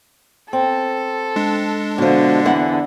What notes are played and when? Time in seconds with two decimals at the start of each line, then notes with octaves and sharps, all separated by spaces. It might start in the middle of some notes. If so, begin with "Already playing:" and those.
0.53 C4 A4
1.36 G#3 D4
1.98 B2 D3 F3
2.45 E2 E3 F#5